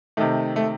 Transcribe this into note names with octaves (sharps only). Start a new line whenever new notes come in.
C3 D#3 A3
A3